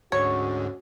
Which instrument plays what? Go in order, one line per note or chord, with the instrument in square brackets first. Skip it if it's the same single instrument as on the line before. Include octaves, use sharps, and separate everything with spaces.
[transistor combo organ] D2 G#2 [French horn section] C#4 F#4 [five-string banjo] C#5